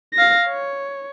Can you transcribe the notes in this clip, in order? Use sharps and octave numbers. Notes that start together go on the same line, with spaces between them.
F5 A#6
C#5